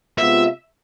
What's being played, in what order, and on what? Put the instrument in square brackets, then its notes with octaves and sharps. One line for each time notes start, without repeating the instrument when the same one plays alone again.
[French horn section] C3 G#3 B3 F4 [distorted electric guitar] E5